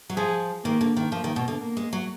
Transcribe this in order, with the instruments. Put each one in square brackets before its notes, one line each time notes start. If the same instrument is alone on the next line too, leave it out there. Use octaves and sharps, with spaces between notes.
[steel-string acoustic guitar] F#3
[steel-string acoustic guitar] F3 [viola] G#4
[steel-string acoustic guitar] D#3 [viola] A#3
[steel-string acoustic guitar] D3
D#3
[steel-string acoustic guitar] F3 [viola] A#3
[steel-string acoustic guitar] D#3
B2
D3
[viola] A#3
[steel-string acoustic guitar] G#3
F#3